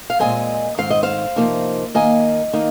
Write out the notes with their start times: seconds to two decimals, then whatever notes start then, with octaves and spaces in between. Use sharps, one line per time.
0.10 F5
0.20 A#2 F3 G#3 C4 D#5 G#5
0.78 G#2 D#3 C4 F5
0.90 D#5
1.03 C5 F5
1.36 C3 F3 A#3 D#4
1.95 D#2 D#3 A#3 D#5 G#5
2.53 D#3 A#3 D#4